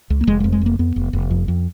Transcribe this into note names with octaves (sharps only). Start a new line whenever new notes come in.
C#2
A#3
F1 G#3
G#3
F2
G#3
F1 A#3
F2 B3
F1
F1
F2
F2